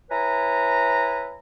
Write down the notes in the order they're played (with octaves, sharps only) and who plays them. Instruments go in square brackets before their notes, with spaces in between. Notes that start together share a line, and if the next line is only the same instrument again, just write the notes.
[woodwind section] E4 B4 C#5 G#5 A#5